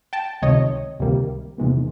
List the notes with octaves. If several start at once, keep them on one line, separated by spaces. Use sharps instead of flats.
G5 A5
C#2 C3 D#3 C#5 D#5
C#2 C3 D#3 G3 A#3
E2 C3 D#3 G#3 B3